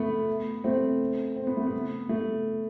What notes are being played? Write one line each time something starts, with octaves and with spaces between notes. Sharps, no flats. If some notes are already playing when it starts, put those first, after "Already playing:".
Already playing: A3 B3
A3 C4
C4
B3
A3
B3
A3